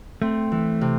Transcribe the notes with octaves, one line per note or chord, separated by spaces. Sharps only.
A3 C4
E3
C3